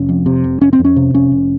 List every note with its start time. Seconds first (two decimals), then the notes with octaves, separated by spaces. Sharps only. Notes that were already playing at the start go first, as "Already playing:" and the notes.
Already playing: F1 C#4
0.09 F2
0.26 C3
0.44 F1
0.61 F1 C#4
0.73 C4
0.79 F2
0.85 C#4
0.96 C3
1.14 F1 C#4
1.32 F1